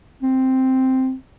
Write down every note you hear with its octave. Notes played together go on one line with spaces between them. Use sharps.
C4